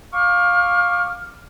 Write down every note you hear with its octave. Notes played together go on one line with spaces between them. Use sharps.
F5 C#6 D6 F6